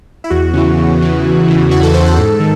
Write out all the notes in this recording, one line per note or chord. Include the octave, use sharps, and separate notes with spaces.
E4
E2 F#4
C#3 E3
E2
C#3 E3
E2
C#3 E3
E2 F#4
A4
C#3 E3 C5
C5
G#2 A4
D#3